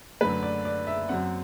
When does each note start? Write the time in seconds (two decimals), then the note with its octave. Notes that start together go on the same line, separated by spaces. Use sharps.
0.21 F#2 D3 F#3 A3 B4
0.43 D5
0.65 D5
0.87 E5
1.09 F#2 F#3 C4 F#5